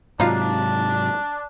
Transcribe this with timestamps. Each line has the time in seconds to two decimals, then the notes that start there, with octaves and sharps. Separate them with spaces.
0.20 G#2 C3 F#3 D4 D#4 F4